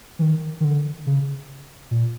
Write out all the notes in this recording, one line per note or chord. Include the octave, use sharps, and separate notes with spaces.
E3
D#3
D#3
D3
C#3
A#2